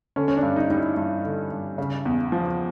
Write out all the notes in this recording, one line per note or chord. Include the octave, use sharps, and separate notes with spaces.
D3 C#4
C#4
D4
G2
D#4
G3 D#4
E4
G2
D3
G2
C#3
E2
F3